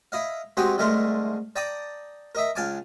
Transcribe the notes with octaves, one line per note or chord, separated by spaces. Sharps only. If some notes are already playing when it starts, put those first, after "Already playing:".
E4 D#5 F5
G#3 C4 F#4 G4 D#5
C2 D3 G#3 A3 A#4 C6
D5 G5 A5 A#5 D6 D#6
A#4 D#5 E5
C#2 F5 G#5 A5 D6